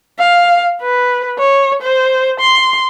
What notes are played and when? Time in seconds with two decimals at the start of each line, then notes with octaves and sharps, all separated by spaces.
0.19 F5
0.82 B4
1.39 C#5
1.82 C5
2.40 C6